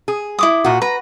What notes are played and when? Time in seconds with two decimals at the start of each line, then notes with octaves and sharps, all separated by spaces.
0.08 G#4
0.39 E4 D6 D#6
0.65 A#2 F#4
0.82 B4 A#5